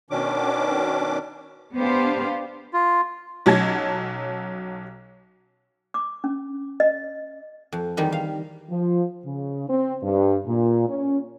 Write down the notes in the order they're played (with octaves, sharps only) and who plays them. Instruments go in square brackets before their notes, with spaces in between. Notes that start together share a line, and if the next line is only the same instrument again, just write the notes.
[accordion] B2 D#3 C#4 D4 D6
[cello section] B3 D4 G4 C5 F5
[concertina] F4
[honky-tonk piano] B1 F#3 C#4 A5 G#6 A#6
[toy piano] D6
C#4
D#5
[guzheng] F2
E2 D#3 G3
F5
[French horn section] F3
C#3
C4
G2
A#2
C#4